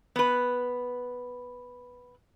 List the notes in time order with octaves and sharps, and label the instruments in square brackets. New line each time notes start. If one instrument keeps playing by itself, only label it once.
[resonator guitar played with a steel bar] B3 B4